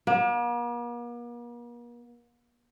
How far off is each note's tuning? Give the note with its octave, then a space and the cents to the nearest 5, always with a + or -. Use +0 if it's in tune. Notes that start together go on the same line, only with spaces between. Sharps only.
A#3 +45